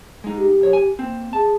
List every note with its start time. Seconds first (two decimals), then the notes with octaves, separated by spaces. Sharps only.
0.24 G#3 D#4
0.36 G4
0.60 B1 C#5
0.73 G#5
0.99 A#3 C4
1.33 G#4 A5